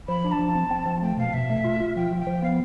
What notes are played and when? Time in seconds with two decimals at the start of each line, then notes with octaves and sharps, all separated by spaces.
0.08 F3 B5
0.24 D4
0.32 A5
0.39 F3
0.55 C4
0.71 C4
0.86 F3
1.02 A3 G5
1.17 B2 F5
1.33 B2 E5
1.50 A3
1.64 F4
1.80 F4
1.96 F3 G5
2.11 F3
2.19 G5
2.27 F3
2.42 B3 F5